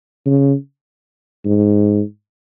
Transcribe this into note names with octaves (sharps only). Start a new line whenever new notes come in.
C#3
G#2